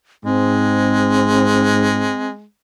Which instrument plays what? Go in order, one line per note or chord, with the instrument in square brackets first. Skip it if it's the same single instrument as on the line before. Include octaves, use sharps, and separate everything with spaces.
[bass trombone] G#2 [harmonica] G#3 [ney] C4